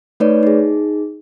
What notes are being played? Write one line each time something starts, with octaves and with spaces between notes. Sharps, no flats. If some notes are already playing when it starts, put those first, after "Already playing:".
A3 D#4 B4 C#5 D5
D#4 G#4